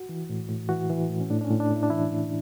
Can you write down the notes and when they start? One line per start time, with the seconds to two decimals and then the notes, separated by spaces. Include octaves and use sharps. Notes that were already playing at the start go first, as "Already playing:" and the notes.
Already playing: F#4
0.09 E3
0.30 A2
0.49 A2
0.69 E3 F#4
0.90 E3
1.10 A2
1.20 C#4
1.30 A2 D4
1.41 D4
1.45 C#4
1.51 A2
1.60 D4
1.71 A2 E4
1.83 D4
1.90 E3 E4
2.11 A2